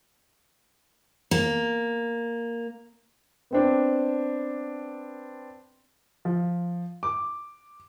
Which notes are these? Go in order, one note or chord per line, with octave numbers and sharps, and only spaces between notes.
A#3
B3 C4 D4
F3
D6